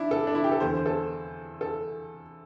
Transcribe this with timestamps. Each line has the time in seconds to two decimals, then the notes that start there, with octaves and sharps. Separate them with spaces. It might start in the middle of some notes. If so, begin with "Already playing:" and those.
Already playing: D4 E4
0.11 A4
0.27 D4
0.35 E4
0.44 G4
0.52 A4
0.60 E2 D3 C5
0.76 C5
0.86 A4
1.61 A4